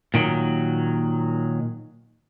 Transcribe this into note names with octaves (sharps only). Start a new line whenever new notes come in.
A#2 D#3 F#3